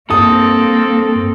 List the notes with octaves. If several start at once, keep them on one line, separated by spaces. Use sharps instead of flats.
G2 A#3 C4 A4 D#6